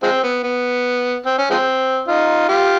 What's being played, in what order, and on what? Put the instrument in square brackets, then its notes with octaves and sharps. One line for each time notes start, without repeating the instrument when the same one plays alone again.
[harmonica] F3 G#3 C4
B3
B3
C4
C#4
F3 G#3 C4
D#4 F4
F4 G4